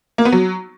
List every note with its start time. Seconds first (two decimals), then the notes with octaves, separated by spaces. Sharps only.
0.18 A#3
0.25 B3
0.32 F#3